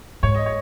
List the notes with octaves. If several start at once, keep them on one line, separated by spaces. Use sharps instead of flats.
G#2 C#5
D#5
C#5